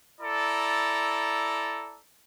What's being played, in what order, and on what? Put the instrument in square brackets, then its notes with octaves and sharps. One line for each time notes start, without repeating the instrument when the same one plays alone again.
[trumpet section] E4 A4 D5 A#5